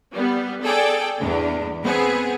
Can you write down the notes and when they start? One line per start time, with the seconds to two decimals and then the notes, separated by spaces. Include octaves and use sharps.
0.14 G3 B3
0.62 G#4 A4 D5 G5
1.19 E2 D4
1.84 B3 C4 G#4